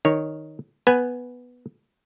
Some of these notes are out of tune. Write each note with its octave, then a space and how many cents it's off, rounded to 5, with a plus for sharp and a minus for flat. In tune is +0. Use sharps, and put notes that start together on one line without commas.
D#3 +0 C#5 +0
B3 +0 B4 +0 G#5 +0